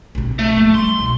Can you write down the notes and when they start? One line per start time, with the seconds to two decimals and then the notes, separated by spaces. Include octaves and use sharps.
0.15 A#1 C3
0.39 A3
0.57 F3 A#3
0.74 G3 C6
0.99 B1